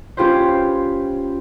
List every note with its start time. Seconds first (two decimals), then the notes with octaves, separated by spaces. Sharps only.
0.17 C#4 F4 G4 B4 C5